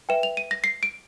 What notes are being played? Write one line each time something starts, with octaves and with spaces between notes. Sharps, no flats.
B4 E5 G5 E7
F7
D#7
A#6
C7
D7